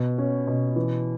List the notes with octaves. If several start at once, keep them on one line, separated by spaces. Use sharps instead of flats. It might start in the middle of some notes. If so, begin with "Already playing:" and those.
Already playing: B2
C#4
B2
E3